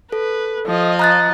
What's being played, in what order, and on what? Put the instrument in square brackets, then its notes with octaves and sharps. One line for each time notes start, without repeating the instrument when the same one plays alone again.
[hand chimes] A4 [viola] B4
[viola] F3 D#5
[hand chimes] A#5 F#6 A6